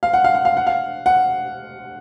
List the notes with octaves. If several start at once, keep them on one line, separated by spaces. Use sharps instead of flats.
F5
F#5
F5
F#5
F5
F#5
F5
F#5